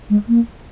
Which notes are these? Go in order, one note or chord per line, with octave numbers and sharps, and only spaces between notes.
G#3
A#3